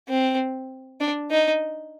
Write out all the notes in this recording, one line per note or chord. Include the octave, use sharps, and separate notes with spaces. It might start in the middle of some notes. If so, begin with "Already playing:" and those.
C4
D4
D#4